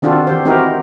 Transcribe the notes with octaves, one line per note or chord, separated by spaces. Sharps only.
D#3 C4 D4 F4 F#4 A4
E3 G4 C5
C4 D#4 E4 F#4 G4 A#4